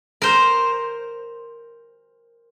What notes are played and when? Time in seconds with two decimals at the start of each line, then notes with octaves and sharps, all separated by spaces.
0.22 A#4 C5